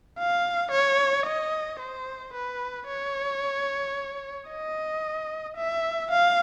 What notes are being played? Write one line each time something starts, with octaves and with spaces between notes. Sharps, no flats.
F5
C#5
D#5
C5
B4
C#5
D#5
E5
F5